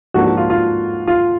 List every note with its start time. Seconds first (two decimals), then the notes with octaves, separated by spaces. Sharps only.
0.14 G#2 F3 A#3 D4 F#4
0.26 F#4
0.37 F4
0.50 F4
1.07 F4